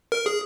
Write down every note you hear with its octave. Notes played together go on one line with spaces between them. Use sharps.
A#4
G#4